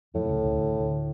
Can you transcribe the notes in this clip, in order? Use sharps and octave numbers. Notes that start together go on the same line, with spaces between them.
F2 A2 F3
B2
C#2 C#3
C#2 C#3
D2 D3
D2 D3